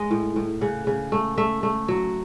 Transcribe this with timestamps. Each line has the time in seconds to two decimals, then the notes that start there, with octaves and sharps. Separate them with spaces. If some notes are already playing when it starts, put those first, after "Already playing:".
Already playing: G#3 D#5
0.11 A2
0.36 A2
0.61 C#3 F#5
0.87 C#3
1.12 A3
1.38 A3 E5
1.63 A3
1.88 F#3